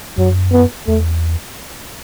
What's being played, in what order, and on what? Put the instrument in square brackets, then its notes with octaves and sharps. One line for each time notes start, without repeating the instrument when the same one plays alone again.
[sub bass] F#2 [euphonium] F#3
[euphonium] B3
[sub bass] E2 [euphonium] A3